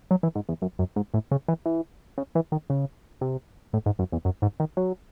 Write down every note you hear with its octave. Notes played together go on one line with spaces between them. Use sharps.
F#3
E3
G#2
E2
F#2
F#2
G#2
A2
C#3
E3
E3
C#3
E3
D#3
C#3
C3
A2
G#2
F#2
E2
F#2
G#2
D#3
F#3